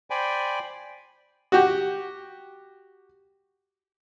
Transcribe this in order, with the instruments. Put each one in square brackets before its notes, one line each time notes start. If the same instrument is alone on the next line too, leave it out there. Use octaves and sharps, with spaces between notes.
[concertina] C5 D5 G5 G#5 B5
[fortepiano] F#4 G4